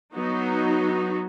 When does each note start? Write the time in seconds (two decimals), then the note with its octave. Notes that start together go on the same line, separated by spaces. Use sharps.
0.13 F#3 B3 D#4 F#4